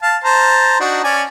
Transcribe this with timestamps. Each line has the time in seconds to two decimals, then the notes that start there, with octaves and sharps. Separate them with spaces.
0.02 F5 A5
0.24 C5 A5 A#5
0.80 D4 D#4 F#4
1.04 C#4 D5 G#5